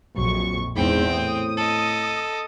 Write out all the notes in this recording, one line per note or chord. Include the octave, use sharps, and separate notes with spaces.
A#1 F2 F#3 C#6
E2 G#2 C4 G5
A2 D#6
A4 D#5